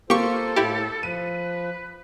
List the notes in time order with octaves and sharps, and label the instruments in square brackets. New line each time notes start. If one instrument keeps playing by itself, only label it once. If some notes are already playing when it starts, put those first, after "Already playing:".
[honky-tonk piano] A#3 [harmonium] F4 C5 [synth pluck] G4 C#6 [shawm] A4
[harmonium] A2 [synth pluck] E4 G4
[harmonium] F3 [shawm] B4 [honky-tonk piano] D#7